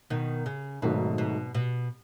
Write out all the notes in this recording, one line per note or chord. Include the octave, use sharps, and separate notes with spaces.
B2 D#3
C#3
G#1 G#2 B2 F#3 A3 D#4
B2
B2